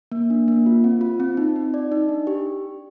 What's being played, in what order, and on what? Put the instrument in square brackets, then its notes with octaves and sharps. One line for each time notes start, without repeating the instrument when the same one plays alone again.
[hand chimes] A#3
D4
A#3
F4
C4
F4
C4
D#4
D#4
D5
D#4
D4
G4